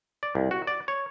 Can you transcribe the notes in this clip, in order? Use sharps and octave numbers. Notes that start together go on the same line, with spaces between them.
D5
C2
F#4
D5
C#5